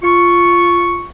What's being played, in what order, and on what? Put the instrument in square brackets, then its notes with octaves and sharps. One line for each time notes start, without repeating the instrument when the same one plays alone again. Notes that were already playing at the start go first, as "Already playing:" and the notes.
[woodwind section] F4 C#6